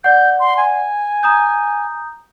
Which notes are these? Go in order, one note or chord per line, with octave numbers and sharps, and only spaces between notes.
D5 F#5 G6
C6
G#5
A#5 D#6 G6